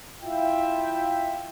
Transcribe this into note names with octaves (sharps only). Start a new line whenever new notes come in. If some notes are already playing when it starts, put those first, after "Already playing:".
E4 F4 E5 G5